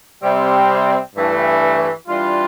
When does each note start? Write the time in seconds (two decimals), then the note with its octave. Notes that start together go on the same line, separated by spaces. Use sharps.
0.22 C3 G3 C4
1.14 G2 E3 A3
2.07 E3 G3 D4 F4